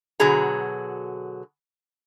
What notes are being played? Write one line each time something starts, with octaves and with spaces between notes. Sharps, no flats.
B2 D3 F#3 G#4 A#5